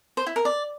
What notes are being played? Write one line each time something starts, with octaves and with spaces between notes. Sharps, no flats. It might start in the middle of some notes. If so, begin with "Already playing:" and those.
C5
E4
A#4
D5